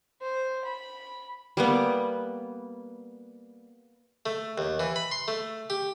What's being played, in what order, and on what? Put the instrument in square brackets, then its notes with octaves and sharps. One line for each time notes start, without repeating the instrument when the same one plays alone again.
[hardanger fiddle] C5
B5
[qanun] G3 A#3 B3
[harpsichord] A3
D#2
E3
B5
C6
A3
G4